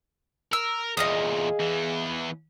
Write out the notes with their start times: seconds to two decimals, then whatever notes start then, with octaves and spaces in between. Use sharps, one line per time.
0.53 A#4 E6
0.97 E2 A#2 G#4 D#5 F5 D#6
1.59 E2 E3